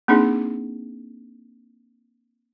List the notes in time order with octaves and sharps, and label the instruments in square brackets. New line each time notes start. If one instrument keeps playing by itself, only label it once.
[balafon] A#3 C4 D4 D#4 G#4